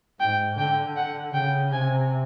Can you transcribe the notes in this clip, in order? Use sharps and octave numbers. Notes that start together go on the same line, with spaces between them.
G#2 G5
D3 G5
F#5
C#3 G5
C3 G#5